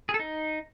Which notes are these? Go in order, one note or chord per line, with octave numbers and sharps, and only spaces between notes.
G#4
A4
D#4